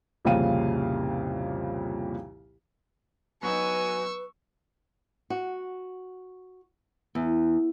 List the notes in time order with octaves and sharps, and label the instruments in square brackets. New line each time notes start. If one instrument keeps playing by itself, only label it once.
[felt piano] C2 F2 A#2 C#3 F5 D#7
[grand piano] F#3 B3 D#4 [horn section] F#4 G#5 [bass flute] B4 [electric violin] C#6 E6
[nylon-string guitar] F#4
E2